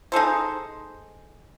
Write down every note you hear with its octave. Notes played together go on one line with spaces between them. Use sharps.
D#4 G#4 A4 C5